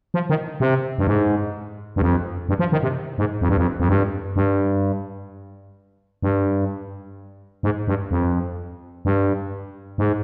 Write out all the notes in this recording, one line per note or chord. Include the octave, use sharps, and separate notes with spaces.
F3
D#3
C3
G2
G#2
G2
F2
G2
F3
D#3
C3
G#2
F2
G2
F2
F2
G2
G2
G2
G#2
G2
F2
G2
G#2